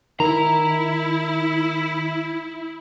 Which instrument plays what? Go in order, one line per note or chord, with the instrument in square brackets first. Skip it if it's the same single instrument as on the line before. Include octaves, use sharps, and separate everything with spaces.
[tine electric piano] D#3 [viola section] E4 [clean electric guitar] A#5